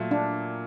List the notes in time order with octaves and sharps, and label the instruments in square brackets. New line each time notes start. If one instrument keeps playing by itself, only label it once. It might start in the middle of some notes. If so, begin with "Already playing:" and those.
Already playing: [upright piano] A#2 F#3 A3
[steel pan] D4